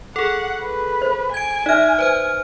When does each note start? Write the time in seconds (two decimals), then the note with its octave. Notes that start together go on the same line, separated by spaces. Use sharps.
0.16 G#4 A4 F#5
0.62 B4
1.02 C5
1.34 G#5 G#6 D7
1.66 D#4 D5 E5 F6
1.99 B4 C5 F6